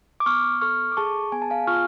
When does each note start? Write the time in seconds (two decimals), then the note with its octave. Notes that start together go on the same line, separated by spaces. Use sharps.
0.20 D6
0.26 B3 C#6 F6
0.61 A4 C#6 F6
0.92 D6
0.97 G#4 A5 C#6
1.32 B3 G#5
1.42 A5
1.50 F5 G#5
1.67 F4 C#6 F6